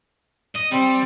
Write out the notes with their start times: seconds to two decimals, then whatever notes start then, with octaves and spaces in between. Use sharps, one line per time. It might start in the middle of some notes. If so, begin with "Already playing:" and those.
0.56 D#5
0.71 G3 C4